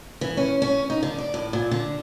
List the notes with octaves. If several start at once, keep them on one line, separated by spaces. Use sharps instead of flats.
E3
C#4
C#4
D#4
D3
D5
A2
A#2
D3